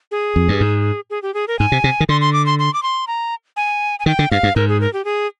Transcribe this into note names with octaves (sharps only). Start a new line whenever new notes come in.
G#4
F2
G2
G#2
G#4
G4
G#4
A#4
G#2 G#5
C3
C3
D#3
D3 C6
C6
D6
C6
C6
D6
C6
A#5
G#5
G#5
D#3 G5
D3
G2 F5
G2
G#2 A#4
G#4
A#4
G4
G#4